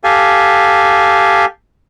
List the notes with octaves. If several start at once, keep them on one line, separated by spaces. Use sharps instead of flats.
G4 A4 F5 G#5